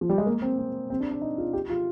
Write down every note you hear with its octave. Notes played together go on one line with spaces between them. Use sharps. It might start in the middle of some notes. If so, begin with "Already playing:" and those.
F3
G3
G#3
A#3
C4
C4
C4
D4
D4
D#4
F4
G4
F4